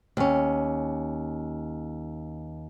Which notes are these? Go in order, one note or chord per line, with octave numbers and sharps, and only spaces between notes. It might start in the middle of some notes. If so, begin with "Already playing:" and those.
D#2 C#4